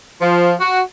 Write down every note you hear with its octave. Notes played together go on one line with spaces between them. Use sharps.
F3
F#4